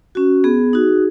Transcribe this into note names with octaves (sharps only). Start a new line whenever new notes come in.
C#4 F#4
B3 G#4
D#4 F#4